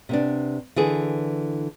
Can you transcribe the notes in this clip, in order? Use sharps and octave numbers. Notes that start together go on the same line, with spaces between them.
C3 B3 D4
D3 E3 G#4